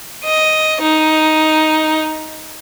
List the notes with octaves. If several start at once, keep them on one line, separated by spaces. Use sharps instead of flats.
D#5
D#4